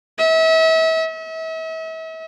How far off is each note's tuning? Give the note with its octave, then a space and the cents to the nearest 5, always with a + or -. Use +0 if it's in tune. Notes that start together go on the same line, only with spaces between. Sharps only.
E5 -35
E5 -40